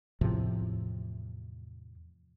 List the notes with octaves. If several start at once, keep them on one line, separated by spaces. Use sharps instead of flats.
E2 A2 C3 F3